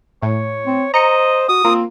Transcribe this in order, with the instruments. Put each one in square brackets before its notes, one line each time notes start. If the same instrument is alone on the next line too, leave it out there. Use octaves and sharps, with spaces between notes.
[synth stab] A2 [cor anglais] C#5
[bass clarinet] C4
[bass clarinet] C5 [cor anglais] D#5 [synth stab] A#5 C#7
[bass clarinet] F#4 [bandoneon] D#6
[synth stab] A#3 [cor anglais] C4 [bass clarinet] F4